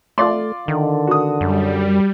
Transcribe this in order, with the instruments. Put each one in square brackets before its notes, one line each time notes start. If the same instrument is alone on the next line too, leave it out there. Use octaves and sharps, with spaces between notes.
[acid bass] A3 [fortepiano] F4 D5 C6
[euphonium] D3 [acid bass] D#3
[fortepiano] F#4 D#6
[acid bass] F#2 [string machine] G3